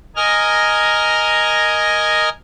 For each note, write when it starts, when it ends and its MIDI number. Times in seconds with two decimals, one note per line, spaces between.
0.16 2.29 70
0.16 2.29 75
0.16 2.29 80
0.16 2.29 89